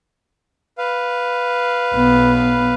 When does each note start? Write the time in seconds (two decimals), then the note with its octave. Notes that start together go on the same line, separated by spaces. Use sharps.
0.78 B4 F5
1.94 B1 B3